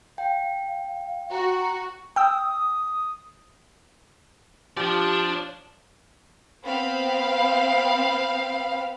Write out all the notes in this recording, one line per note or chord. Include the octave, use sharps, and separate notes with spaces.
F5 G5
F#4 A#5
G5 D#6 E6
F3 D4 G4 D5
B3 C4 F5 B5